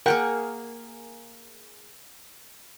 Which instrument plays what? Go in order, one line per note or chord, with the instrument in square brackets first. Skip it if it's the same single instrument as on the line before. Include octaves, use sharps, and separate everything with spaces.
[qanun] A#3 G#4 C#6 [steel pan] A#4 F#5 G5